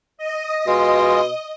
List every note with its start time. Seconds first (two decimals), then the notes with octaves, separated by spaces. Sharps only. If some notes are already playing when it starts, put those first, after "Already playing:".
0.17 D#5
0.67 B2 G#3 F4 D#6